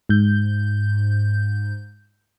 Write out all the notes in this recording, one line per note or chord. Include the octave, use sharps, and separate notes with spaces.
G#2 G6